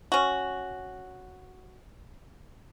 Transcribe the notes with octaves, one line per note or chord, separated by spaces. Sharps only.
C#4 F#4